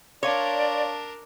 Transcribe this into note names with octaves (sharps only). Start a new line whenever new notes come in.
D4 A#4 C#5 D5 F5 C6 D6